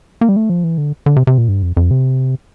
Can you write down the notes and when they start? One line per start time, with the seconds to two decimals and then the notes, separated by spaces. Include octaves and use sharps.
0.21 A#3
0.29 G3
0.36 A3
0.50 F3
0.64 E3
0.78 D3
1.06 D3
1.16 C3
1.27 C3
1.38 A#2
1.48 G2
1.63 F2
1.77 F2
1.91 C3